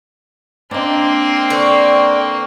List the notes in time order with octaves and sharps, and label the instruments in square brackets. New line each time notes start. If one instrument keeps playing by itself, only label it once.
[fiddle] A#3 C4 [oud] D4 D#5
[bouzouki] D3 [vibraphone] B4 G5 C#6